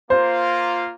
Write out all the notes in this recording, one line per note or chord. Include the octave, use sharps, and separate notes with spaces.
A#3 F4 C5